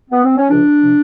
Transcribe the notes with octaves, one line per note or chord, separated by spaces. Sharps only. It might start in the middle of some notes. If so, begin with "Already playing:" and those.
B3
C4
C#4
C#2 C#3 F3 D4
C3 F3